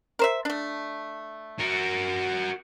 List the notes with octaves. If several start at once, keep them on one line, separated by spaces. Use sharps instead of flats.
A#4 C5 E5
A3 D4
F#4 A#4